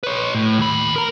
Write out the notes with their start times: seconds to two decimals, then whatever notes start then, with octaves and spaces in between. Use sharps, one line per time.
0.03 B4 C#5
0.35 A2
0.59 D#2 B5
0.96 A#4 A#5